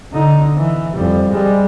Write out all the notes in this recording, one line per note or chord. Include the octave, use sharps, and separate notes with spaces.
D3 D#4
E3
F2 G3
G3 G#3